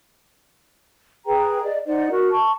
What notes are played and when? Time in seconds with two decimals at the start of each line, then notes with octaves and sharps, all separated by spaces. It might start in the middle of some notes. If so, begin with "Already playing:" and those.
1.26 G#4 B4 G5 A#5
1.62 D5 D#5
1.86 D#4 C5 D5 F#5
2.10 F#4 A#4
2.31 A5 C#6